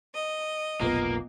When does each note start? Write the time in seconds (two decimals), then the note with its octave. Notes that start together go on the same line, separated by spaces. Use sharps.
0.16 D#5
0.81 F1 B1 A#2 A#3 B3